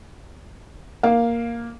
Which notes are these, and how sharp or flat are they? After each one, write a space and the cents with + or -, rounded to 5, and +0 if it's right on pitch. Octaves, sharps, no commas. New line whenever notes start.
A#3 +0 F5 +0